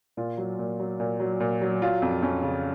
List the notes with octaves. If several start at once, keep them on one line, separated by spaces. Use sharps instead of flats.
A#2 F4
F#3
A#2
F#3
A#2
F#3
A#2
F#3
F#3 F4
F2
F2 C#4
C#3